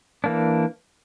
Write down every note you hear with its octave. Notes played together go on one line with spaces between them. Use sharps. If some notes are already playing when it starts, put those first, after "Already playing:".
E3 A#3 D4